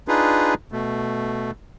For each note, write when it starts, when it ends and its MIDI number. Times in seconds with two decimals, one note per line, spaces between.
0.08 0.54 62
0.08 0.54 63
0.08 0.54 65
0.08 0.54 68
0.08 0.54 71
0.72 1.51 47
0.72 1.51 57